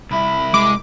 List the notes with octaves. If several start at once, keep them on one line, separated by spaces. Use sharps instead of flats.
C2 E4 B5
G#3 D6